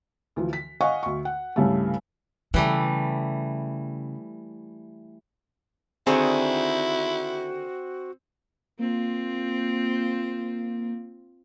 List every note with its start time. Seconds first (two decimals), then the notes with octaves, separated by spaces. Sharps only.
0.36 D2 E3 F3
0.53 B6
0.81 D#5 F5 F#5 G#5 C#6
1.03 D2 C#6
1.25 F#5
1.56 C2 G2 C#3 G3 A3
2.54 C#3 E3 G3 A3
6.07 D3 D#3 C4 E4 F#4 G#4
8.79 A#3 C4 F4